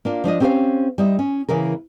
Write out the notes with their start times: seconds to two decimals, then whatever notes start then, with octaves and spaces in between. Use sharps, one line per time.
0.05 A#3 D4 F4
0.24 F3 D4 F4 D#5
0.40 C4 C#4 G4 A#4 C5 F5
0.98 G3 D#4 E5
1.19 C#4
1.49 C#3 E3 A#3 A#4